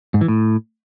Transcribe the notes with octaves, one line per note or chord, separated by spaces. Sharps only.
G#2
E3
A2